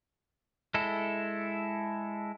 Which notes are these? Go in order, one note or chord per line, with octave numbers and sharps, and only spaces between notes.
G#3 E4 A4